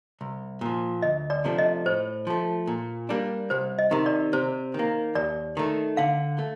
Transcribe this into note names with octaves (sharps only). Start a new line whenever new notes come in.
C2
A#2 F3
D2 D#5
D5
C3 F3 A3 D4
D#5
A2 C5
F3 A3
A#2
G3 A#3 D4
C2 C5
D#5
C3 D#3
D5
C3 C5
D#3 A#3
D#2 D5
D#3 A3
D3 F5
A3